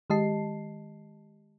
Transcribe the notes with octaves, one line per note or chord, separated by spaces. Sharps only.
D#3 G#3 G4 D#5 A5 C7